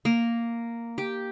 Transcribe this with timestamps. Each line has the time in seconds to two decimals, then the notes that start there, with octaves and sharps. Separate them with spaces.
0.05 A#3
0.98 G4